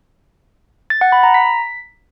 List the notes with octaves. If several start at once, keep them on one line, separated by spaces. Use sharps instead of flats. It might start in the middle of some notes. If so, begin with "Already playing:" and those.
A6
F#5
B5
A#5
B6